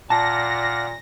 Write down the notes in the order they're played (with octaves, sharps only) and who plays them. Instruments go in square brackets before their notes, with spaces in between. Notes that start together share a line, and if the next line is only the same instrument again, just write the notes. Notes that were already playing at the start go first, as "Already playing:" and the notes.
[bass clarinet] A#2 [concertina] D5 F5 F#5 [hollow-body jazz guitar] A5 [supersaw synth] A#6